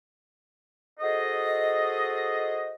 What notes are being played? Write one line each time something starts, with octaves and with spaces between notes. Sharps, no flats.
F#4 G#4 A4 C5 D#5